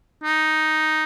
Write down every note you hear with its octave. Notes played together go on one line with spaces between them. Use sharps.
D#4